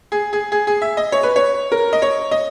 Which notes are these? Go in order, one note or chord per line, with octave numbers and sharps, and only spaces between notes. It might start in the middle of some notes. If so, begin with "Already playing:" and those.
G#4
G#4
G#4
G#4
E5
D#5
C#5
B4
C#5
A#4
D#5
C#5
D#5